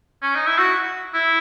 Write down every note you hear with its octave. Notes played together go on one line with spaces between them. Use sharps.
C#4
D#4
E4
F#4
E4